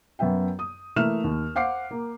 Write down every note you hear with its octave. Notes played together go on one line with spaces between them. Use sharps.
F#2 B3 E5 G5
D#6
E3 A3 A#3 E5 F6 E7
D#2
C5 F5 F#5 D6 C7
A#3